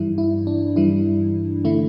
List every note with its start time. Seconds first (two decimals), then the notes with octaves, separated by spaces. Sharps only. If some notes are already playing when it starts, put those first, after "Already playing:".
Already playing: G2 E3 G3 E4
0.18 E4
0.47 D4
0.76 G2 E3 G3 E4
1.65 D3 A3 E4